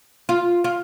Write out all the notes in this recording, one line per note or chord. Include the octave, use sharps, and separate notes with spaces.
F4
F4